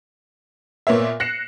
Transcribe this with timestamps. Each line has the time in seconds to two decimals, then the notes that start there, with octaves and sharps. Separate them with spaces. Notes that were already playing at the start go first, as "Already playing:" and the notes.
0.87 A#2 A#3 B3 C#5 E5
1.20 F#6 A#6 C7 C#7 E7